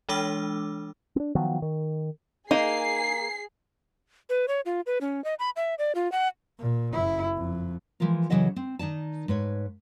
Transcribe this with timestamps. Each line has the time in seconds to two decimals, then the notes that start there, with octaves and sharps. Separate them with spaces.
0.09 E3 G#3 D4 D6 E6
1.16 C4 D4
1.35 D#3 F3 F#3 B3
1.62 D#3
2.51 A#3 D#4 G#4 C7
4.30 B4
4.48 C#5
4.66 F4
4.87 B4
5.01 C#4
5.24 D#5
5.39 B5
5.56 E5
5.78 D5
5.95 F4
6.12 F#5
6.59 A#2
6.93 F#1 E4
7.37 F2
8.00 E3 F3 G#3 F4 A#4
8.30 C#3 E3 F#3 A4 D#5 F#5
8.56 C4
8.79 D#3 D#4 D5 A5
9.28 G#2 B4 C#5